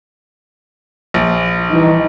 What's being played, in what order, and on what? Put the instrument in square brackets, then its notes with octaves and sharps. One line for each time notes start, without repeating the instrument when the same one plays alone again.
[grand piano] A#1
[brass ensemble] E3 G3 D#4